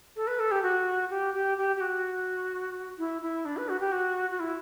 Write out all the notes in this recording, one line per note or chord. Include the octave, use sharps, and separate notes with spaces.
A4
B4
A4
G4
F#4
G4
G4
G4
G4
F#4
E4
E4
D4
B4
F#4
G4
F#4
F#4
E4